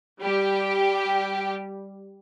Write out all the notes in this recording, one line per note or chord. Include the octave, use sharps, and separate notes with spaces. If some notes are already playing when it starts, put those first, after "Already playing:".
G3 G4